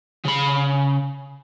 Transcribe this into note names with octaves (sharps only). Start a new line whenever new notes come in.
C#3 B5